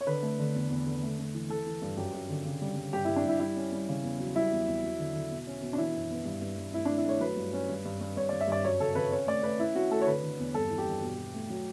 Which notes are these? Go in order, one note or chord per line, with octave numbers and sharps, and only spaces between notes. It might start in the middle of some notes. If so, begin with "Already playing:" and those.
C#5
D3 B4
A3
D3
E2
E2
D3
A3
A3
E3
E3 A4
E3
G2
F#2 G4
F#2
D3
C#3
G3
G3
G2 G4
E4
G2
D4
G2 E4
G3 E4
C#4
G3
C#3
E2
F#3
G3 E4
E2
E2
F#3
D3
D3
B2
C#4
B2
D4
E3 E4
F#2
B3
G2
G2
G2
A3 E4
D4
A3
E4
A3 C#5
F#3 B4
G2
C#4
G2
G2
G2
G2 C#5
D5
G2
E5
G2 D5
F#2 C#5
C#3 A4
C#3 B4
C#4 C#5
A3 D5
A3 B4
C#4 E4
C#4 F#4
A3 A4
C#5
D3 B4
D3
E2
G2 A4
E3
G4
G2
B2
B2
A3
F#3